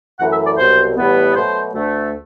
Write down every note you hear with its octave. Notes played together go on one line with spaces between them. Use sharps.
F#2 E3 A3 F#5
E5
D5
C2 B2 F#3 C5
A2 E3 G3 B3
B2 F#3 A3 C5
D2 D3 A3